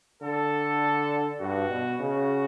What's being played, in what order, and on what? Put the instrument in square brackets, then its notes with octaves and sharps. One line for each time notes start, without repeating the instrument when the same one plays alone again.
[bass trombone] D3 [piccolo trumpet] A4
[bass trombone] G2 [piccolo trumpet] F#4
[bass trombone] B2
[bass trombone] C#3 [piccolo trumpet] F#4